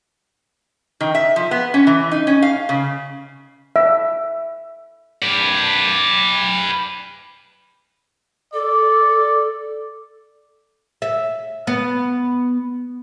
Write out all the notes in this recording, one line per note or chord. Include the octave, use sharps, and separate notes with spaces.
D#3
E5
F3
B3
C#4
E3
D#4
C#4
F5
C#3
E5
B4 D5
A4 D5
E5
B3